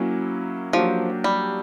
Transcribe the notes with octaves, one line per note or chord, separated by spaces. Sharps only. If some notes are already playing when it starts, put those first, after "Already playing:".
Already playing: F#3 A#3 C#4 E4
F3 F#3 A#3 D4 G4
G3